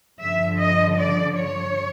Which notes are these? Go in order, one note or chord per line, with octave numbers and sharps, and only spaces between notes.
G2 D3 F3 E5
D#5
D5
C#5